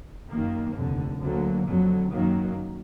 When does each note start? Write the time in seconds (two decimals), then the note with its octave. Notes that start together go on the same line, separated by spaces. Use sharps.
0.30 F#2 D#3 A#3
0.75 F1 D#2 D3
1.21 D2 D3 F#3 A#3
1.66 F2 D3 F#3
2.11 F#2 D#3 F#3 A#3